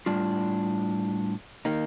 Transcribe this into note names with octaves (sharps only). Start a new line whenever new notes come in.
A2 G3 D4 F4
D#3 A#3 D#4